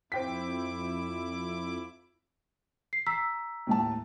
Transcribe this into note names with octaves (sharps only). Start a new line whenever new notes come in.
F2 C4 E4 G5 D6 B6
C7
A#5 E6 B6
D#2 A2 A5